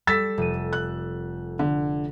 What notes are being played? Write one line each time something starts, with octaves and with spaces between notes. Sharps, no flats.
G3 A4 E6 A6 B6
F1 D#7
F#6
D3